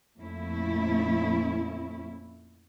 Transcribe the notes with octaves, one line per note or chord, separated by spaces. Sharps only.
F2 A#2 A3 C#4 E4